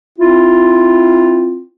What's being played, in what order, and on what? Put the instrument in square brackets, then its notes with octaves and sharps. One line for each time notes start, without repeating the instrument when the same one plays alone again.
[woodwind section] C4 E4 F4